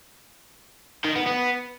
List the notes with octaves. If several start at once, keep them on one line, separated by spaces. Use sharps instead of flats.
D#3
B3
B3